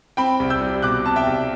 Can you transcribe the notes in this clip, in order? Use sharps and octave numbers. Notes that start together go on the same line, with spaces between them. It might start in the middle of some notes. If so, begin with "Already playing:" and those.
C4 G5 B5
C2
E6 G6
G3
B2 D6 F#6
C4 A5
E5 G5
C2